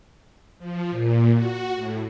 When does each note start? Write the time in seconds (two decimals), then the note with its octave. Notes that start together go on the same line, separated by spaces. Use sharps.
0.59 F3
0.90 A#2
1.33 F#4
1.75 A2